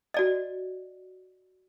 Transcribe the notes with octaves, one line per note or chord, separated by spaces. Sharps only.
F#4 D5 D#5